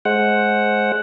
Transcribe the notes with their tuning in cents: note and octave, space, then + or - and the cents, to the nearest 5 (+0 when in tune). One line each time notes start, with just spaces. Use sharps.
G#3 +20 C5 +10 F#5 +0